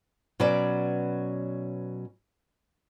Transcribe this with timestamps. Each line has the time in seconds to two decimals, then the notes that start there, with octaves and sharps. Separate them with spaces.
0.40 B2 F#3 C#4 B4 D5